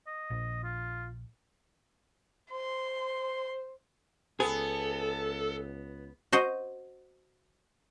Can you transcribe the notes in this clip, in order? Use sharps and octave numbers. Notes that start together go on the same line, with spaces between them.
D#5
A#1
F4
C5 C6
C#2 B3 G#4 A4
F#4 C5 D#5